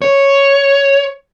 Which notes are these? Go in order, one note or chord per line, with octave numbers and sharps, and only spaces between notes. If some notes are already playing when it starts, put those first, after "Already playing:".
C#5